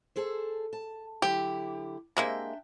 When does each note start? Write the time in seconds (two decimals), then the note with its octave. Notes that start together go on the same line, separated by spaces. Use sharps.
0.16 G#4 A4 C5
0.73 A5
1.22 D3 F#3 E4 G4
2.17 C3 G#3 A#3 D4 E5 G5